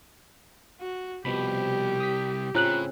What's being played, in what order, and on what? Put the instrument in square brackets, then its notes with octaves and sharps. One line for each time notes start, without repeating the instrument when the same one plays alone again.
[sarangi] F#4
[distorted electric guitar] C2 [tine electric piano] B2 F3 B5 [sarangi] G4
[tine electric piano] D#6 B6
[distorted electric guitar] A2 [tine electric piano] C#3 C4 C#4 [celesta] F4 F#6 F#7